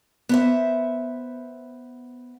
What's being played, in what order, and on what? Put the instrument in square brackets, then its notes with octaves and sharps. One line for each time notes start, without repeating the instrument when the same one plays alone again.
[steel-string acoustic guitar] B3 C5 E5